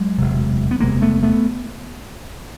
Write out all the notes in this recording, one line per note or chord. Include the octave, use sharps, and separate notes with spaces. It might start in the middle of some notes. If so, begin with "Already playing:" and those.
Already playing: F#3 G#3
E1 D2 C3
B3
E1 D2 C3 G#3 A#3
A3 B3
A3 B3